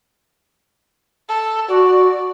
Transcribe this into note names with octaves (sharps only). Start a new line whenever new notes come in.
A4
F#4 D5